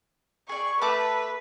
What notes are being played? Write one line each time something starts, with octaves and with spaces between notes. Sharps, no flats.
G#4 D5 C#6
A3 B4 A5 D6